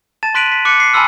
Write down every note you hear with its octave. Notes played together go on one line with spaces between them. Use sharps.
A5 A6 E7
C6 F#6 B6 D7 D#7 F#7
B6
D6 F#6 C#7
C7
G#5 A5 B5 C6 E6 F6